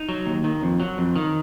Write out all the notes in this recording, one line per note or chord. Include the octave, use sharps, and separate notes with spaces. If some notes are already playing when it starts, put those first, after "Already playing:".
Already playing: D#4
F#3
D#2
D#3
F2
F#3
F2
D#3